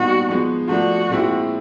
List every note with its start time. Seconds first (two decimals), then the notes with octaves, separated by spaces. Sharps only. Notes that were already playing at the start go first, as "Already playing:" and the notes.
Already playing: A#2 G3 B3 D#4 F#4
0.29 F3 G#3 B3
0.69 F3 A3 D4 F#4
1.09 A#2 F3 G#3 C4 E4